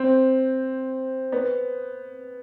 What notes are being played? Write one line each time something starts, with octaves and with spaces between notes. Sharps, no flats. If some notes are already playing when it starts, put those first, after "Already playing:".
Already playing: C4
B3